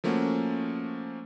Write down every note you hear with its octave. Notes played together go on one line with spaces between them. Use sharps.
F3 A3 A#3 C#4 F#4